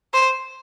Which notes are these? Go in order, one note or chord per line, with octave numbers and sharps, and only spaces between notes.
C5